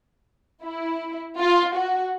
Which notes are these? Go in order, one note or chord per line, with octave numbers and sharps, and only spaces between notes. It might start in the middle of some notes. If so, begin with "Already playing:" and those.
E4
F4
F#4